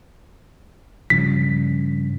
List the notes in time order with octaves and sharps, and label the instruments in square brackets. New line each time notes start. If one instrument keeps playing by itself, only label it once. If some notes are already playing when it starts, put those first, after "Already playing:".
[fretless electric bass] G2 C#3 F3 [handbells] B6